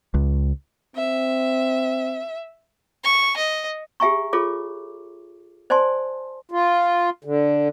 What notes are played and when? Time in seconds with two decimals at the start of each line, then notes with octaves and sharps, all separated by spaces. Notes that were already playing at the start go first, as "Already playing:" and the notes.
0.14 C#2
0.96 C4 E5
3.04 C#6
3.37 D#5
4.00 G4 G#4 E5 G#5 A#5 C#6
4.33 F4 G#4 A4 C#5 D6
5.70 C5 D5 G#5 A5 C6
6.51 F4
7.24 D3